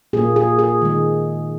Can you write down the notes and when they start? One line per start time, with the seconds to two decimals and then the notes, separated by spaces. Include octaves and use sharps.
0.13 A#2 A#3 G#4
0.36 G#4
0.59 G#4
0.82 D#3 G#3